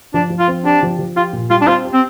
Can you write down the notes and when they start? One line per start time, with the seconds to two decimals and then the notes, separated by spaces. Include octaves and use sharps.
0.14 F3 D4
0.30 F3
0.39 F4
0.48 C4
0.64 D4 G4
0.83 F3
0.99 F3
1.16 F4 G4
1.33 A#2
1.50 G3 F4
1.62 D4
1.67 C4 F4
1.85 G4
1.93 C4